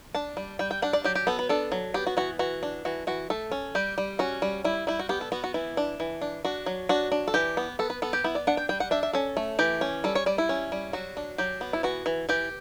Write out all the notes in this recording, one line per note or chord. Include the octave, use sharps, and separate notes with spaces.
D4 A5
G3
G3 G5
G5
D4 F#5
D5
F#3 G4
G4
B3 A4
B4
D4 A4
F#3
B3 G4
F#4
E3 F#4
E3 F#4
D4
E3 F#4
E3 F#4
A3 A4
C#4
G3 G4
G3
C#4 F#4
G3
G3 E4
G3 E4
F#4
B3 G4
A4
B3 F#4
F#4
E3 E4
D4
E3
D4
D4 F#4
F#3
D4 F#4
D4
A4
E3 G4
B3
B3 A4
B4
B3 A4
G4
B3 E4
D5
D4 F#5
G5
G3 G5
F#5
D4 E5
E5
C#4 A4
A3
E3 G4
C#4
G3 A4
C#5
G3 D5
E4
C#4
G3
F#3 F#4
D4
F#3 G4
B3
E4
E3 F#4
E3
E3 G4